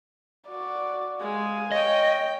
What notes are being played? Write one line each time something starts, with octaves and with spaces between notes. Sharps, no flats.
F#4 D5
G#3 F5 G#5
C#5 D#5 G5